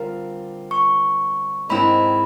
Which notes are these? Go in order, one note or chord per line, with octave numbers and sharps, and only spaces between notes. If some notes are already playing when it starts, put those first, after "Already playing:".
Already playing: D3 G3 C4 F4 A#4
C#6
G#2 D#3 G#3 C4 E4 B5